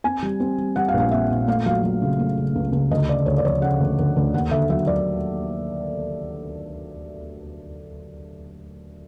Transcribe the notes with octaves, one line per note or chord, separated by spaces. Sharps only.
C4 G#5
G3
C4
G3
G3 F#5
F5
A#1
F5
C4 E5
A#2
A3 F5
F#3 F5
F#3
C#3
A3
C#3
C#2
C#2
D2 D#5
C#3 D5
D2 C#5
D5
F3 C#5
C#3 F#5
D2
D2
D2
D#2 F#5
D3 E5
F#3 E5
F#3 D5